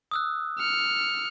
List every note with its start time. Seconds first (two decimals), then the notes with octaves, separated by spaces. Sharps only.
0.11 D#6 E6 F#6
0.58 F6 C#7